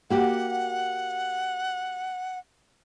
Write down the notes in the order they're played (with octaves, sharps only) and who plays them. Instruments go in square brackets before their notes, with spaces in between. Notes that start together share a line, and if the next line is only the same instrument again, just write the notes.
[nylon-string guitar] A#3 F#4 G4 [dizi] F#5